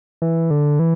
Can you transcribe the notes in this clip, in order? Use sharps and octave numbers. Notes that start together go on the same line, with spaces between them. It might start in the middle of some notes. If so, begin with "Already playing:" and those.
E3
D3
E3